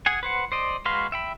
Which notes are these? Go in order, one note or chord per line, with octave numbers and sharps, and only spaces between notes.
G#4 F#5 G#5
B4 C5 F#5
C5 D5 D#5
G#3 F#4 B4 F5 C6
E5 G5 B5